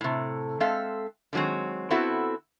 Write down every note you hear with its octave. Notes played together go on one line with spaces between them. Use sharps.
A2 C3
G#3 C4 A4 E5 F5
D3 D#3 F#3 G#3 C4
B3 C4 E4 F#4 A4